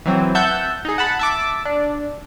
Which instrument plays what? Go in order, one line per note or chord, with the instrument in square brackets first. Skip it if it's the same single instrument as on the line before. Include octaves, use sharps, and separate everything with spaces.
[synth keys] E3 F#3 C4
E5 F#5 A5 G6
D#4 G#4
F#5 A5 B5
E5 A5 D6
D4